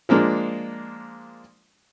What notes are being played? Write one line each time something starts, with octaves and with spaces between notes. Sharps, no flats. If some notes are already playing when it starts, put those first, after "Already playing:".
F3 G#3 A#3 D4